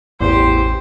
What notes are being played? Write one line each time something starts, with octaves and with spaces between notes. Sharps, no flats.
A1 E2 G4 C5